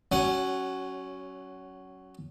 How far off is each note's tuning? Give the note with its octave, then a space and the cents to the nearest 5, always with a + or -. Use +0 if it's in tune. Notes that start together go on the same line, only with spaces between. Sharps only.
F#3 +20 C#4 +0 F#5 +0